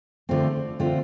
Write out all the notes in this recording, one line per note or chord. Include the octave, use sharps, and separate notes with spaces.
D3 A3 C4 F4
D3 A3 C4 F4